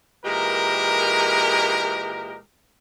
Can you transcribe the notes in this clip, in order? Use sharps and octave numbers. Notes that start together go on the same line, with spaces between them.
A#2 E3 G#3 G4 A#4